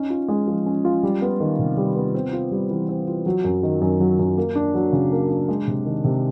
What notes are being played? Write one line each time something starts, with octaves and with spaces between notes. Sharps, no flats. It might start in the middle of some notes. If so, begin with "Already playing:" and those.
Already playing: C#4 D#4
F4
G#3
F3
C#4
F4
G3
B3
D#3
C3
G3
B3
C4
F4
G3
E3
C4
F4
F#3
F#2
D#3
F#2
F#3
F#2
A#3
D4
F#3
C#3
A#3
D4
G#3
C3
D#3
C3